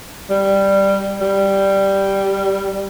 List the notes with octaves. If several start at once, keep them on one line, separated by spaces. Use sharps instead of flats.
G3
G3